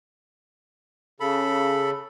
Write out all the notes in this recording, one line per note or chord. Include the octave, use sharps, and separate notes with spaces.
C#3 A4 B5